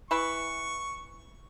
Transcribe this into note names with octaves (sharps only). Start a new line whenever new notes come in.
E3 E4 B4 C#6